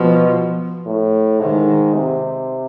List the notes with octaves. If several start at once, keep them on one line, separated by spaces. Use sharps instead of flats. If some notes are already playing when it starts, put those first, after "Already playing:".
Already playing: B2 F3
A2
G#2 D#3
C3